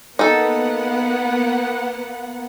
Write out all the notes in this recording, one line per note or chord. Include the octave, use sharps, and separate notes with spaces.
A#3 B3 D#4 A4 F#5